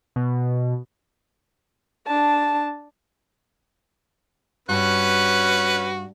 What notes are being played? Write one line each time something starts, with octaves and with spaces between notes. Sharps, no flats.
B2
D4 A5
G2 C#4 F#4 B4 F#6